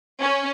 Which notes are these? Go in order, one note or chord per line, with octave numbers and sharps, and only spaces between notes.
C#4